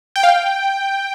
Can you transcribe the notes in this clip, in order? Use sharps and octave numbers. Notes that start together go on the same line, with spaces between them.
G5
F5
G5